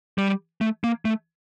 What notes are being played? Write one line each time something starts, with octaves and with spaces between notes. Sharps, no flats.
G3
A3
A#3
A3